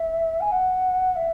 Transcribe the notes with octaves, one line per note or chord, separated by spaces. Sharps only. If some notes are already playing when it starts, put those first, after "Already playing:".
Already playing: E5
G#5
F#5
E5